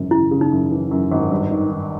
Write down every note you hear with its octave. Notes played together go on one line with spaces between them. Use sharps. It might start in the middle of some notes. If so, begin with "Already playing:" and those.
Already playing: G#1 F#2 C#3 E3
C#3 E4
C#3
D#4
F#2
E3
F#2
G#1
G2
D#3
D#3